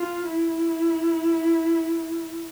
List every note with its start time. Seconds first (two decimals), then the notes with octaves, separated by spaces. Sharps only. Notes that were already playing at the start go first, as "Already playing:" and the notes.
Already playing: F4
0.26 E4